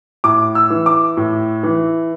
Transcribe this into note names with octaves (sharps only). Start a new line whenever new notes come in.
A2 D6
E6
E3
D6
A2
E3